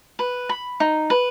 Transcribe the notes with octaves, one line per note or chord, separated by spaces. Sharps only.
B4
B5
D#4
B4